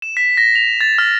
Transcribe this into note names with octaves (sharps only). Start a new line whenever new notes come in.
E7
B6
A#6
F7
A6
F6